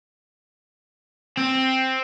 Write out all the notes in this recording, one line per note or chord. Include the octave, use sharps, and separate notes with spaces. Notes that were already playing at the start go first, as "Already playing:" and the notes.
C4